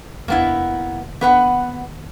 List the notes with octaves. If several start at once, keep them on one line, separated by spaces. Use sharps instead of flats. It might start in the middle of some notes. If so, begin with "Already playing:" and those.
F1 D#2 A#3 B3 E4
B3 B4 F#5